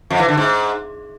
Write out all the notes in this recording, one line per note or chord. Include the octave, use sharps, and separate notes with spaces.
F2
E3
D3
G#2